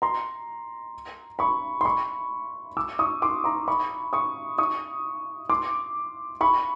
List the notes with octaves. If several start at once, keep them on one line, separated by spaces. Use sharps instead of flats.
A#5 C6
B5 C#6
C6
B5 C#6
D6 E6
C#6 D#6
C6 D6
A#5 C6
B5 C#6
C#6 D#6
C#6 D#6
C6 D6
B5 C#6